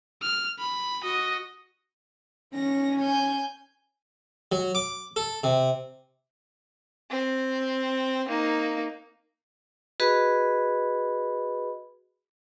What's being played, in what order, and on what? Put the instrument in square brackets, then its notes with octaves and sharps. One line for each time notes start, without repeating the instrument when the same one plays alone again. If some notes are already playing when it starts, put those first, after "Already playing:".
[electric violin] F6
B5
F#4 D#5
[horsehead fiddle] C#4 [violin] A#6
[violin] G#5 G6
[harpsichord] F#3
D6
A4
C3
[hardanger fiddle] C4
A#3 D#4
[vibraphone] F#4 G#4 B4 D#5 B5